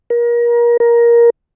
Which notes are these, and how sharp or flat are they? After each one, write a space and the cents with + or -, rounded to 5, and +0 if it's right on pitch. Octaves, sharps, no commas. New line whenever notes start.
A#4 +30
A#4 +15